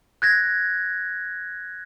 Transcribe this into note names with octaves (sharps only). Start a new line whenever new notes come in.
F#6 G#6 A#6